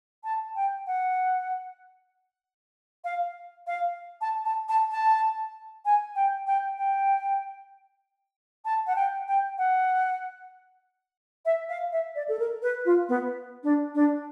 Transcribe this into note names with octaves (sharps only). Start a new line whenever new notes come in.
A5
G5
F#5
F5
F5
A5
A5
A5
A5
G#5
G5
G5
G5
A5
F#5
G5
G5
F#5
E5
F5
E5
D5
A4
A#4
B4
F4
B3
D4
D4